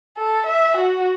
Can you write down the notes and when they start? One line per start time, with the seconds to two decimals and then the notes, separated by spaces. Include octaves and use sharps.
0.18 A4
0.47 E5
0.78 F#4